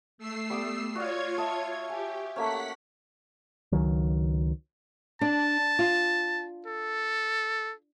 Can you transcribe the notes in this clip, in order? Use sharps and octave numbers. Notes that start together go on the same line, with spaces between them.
A3 E6 C7
G3 B3 D6 D#6
F4 F#4 C#5 D5 F5 G#6
D#5 E5 A5
G4 G#5
A3 A#3 C#4 F#5 B6
C#2 D#3 F#3
D4 A5
F4
A4